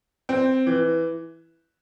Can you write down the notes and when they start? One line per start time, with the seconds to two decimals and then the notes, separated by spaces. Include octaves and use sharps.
0.29 C4
0.67 E3